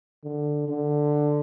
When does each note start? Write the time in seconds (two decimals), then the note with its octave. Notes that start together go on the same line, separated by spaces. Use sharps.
0.24 D3
0.68 D3